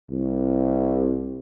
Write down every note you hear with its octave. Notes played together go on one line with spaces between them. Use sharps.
C2